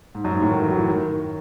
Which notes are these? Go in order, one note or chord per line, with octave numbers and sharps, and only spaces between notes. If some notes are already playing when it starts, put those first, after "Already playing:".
G#2
F#2
G#2
A2
D#3
E3
F#3
E3
D#3
D#3